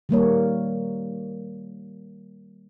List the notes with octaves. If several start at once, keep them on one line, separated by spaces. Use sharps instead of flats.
D#3 G3 A#3 C#5